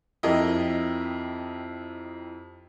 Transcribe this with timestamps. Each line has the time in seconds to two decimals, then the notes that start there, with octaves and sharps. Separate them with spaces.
0.23 F2 E4 G4 A#4 D#5